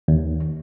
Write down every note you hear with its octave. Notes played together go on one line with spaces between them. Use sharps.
D#2